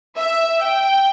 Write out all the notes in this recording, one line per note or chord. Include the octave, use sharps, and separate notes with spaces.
E5
G5